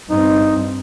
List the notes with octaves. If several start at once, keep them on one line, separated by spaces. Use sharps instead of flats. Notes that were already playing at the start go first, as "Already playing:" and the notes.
G2 C4 D#4